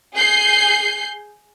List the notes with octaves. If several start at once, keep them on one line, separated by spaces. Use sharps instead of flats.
G#4 G6 C7